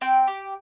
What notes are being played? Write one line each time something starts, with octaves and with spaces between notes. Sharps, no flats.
C4 G5
G4